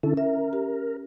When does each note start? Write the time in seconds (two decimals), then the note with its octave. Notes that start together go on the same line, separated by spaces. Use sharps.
0.03 D3 C#4 E4 A4
0.17 A#4 E5
0.53 G4